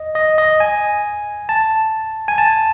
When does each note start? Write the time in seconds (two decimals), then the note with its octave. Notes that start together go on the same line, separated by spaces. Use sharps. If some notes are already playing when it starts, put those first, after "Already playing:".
Already playing: D#5
0.15 D#5
0.38 D#5
0.60 G#5
1.49 A5
2.28 G#5
2.38 A5